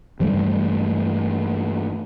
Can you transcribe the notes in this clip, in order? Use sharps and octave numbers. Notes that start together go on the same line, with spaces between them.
G2 E3 G3 A3